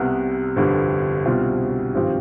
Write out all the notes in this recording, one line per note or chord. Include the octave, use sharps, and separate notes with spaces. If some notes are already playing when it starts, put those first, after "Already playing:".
Already playing: C2 C3 G3 B3
G1 F2 D3 G3
C2 B2 G3 C4 F4
G#1 G2 F3 C4 G4